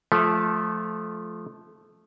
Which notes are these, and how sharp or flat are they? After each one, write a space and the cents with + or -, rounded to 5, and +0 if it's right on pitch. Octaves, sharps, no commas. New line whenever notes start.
F3 +0 A3 -20 E5 +5